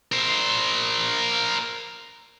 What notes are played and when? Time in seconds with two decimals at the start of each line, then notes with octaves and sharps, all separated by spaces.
0.12 A#4 C5